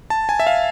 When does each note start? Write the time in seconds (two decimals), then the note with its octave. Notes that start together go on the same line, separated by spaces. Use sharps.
0.10 A5
0.29 G#5
0.40 E5
0.47 F5